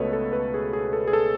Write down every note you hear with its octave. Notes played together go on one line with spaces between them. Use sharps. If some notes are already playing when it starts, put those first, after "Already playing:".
Already playing: C#2 B2 A3 A4 B4 C#5 D#5
A4
B4
G#4
G#4
A4
G#4
A4